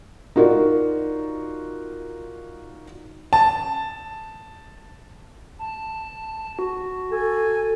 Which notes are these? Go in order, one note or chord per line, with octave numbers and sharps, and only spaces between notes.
D#4 F4 F#4 A#4 D5
A5
A5
F#4
A4 G#5